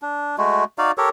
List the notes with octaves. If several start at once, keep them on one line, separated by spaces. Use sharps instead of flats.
D4
G#3 A3 F#4
D#4 F#4 D5 F5
G4 A4 A#4 C#5